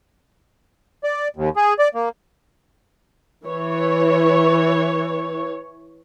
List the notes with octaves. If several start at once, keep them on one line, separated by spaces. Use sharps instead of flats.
D5
D#2
G#4
D5
A#3
E3 C#5